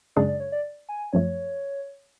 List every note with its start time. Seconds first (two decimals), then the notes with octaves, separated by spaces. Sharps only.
0.16 F#2 C#3 G#3 D4 G#4 D5
0.28 D5
0.40 C#5
0.52 D5
0.89 G#5
1.13 F#2 F3 A3 C#5